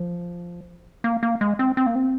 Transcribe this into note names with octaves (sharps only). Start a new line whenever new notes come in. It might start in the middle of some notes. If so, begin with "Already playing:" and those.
Already playing: F3
A#3
A#3
G#3
C4
C4
A#3
C4